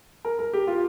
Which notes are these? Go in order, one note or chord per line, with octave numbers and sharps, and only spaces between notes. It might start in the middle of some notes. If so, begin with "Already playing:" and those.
A#4
A#4
G4
F4